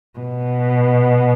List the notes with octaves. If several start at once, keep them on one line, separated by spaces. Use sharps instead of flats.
B2